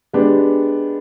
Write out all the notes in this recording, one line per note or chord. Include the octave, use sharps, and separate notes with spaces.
G#3 B3 D4 G4